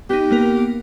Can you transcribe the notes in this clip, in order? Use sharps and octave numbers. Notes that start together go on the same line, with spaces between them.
B3 D#4 G4
A#3 B3 A#4